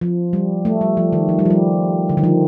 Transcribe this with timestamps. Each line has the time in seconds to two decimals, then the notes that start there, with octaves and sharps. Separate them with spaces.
0.01 F3
0.33 G3
0.65 A3
0.81 G3
0.97 F3
1.13 D#3
1.29 F3
1.39 G3
1.45 F3
1.50 G3
2.09 D3
2.17 D#3
2.24 F3